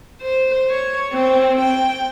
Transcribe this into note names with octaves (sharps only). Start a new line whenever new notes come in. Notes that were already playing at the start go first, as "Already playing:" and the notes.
C5
C#5
C4
G5